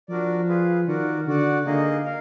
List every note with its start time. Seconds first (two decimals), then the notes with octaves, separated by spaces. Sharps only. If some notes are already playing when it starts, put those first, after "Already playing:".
0.09 F3 D4 F#4 A#4 D5
0.48 F4 G#4 B4
0.88 D#3 F#4 A#4 D5 F#5
1.27 D3 F#4 D5 F#5
1.66 D3 A#3 D#4 G#4 D#5
2.05 A#4 F5